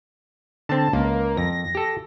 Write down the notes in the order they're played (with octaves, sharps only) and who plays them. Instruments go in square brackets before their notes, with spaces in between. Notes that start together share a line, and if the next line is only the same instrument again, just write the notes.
[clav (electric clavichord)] D3 C4 [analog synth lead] A5
[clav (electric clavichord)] C#2 [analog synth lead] A#3
[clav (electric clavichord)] F2 [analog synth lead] A#6
[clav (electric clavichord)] G4 A4